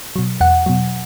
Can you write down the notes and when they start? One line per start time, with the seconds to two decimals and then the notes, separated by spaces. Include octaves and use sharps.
0.16 B2 F#3
0.41 E2 F#5
0.66 B2 F#3